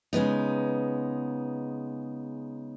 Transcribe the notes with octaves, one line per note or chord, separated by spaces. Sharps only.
C#3 G#3 B3 D#4